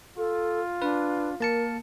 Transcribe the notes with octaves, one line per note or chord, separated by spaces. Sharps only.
F4 A4
D4 B4
A#3 A#4 A5 C#7